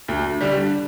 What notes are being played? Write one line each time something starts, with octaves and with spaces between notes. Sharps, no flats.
D2
D3 G3